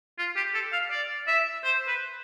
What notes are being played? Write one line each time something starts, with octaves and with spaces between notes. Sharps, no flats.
F4
G4
A4
F5
D5
E5
C5
B4